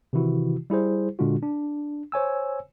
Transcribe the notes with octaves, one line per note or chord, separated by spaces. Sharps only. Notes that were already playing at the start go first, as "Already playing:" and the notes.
C3 D#3 E3 E4 F#4
G3 E4 G#4 C5
A#2 D3 G#3 D4 F4 F#4
D4
C5 C#5 G#5 E6